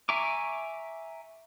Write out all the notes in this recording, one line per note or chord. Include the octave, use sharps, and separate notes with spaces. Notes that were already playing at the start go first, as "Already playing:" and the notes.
E5 G#5 A#5 C#6 D6